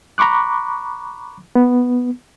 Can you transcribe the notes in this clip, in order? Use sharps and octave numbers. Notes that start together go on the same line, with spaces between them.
A#5 B5 C#6 D6 F#6
B3